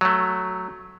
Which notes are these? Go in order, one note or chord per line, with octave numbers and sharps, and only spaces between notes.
F#3 A3